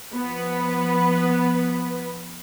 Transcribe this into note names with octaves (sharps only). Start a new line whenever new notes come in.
F3 B3 B4